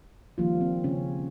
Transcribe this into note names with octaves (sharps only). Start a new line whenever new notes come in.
D#3 F3 G3 A#3 F4
C4
C#3 C#4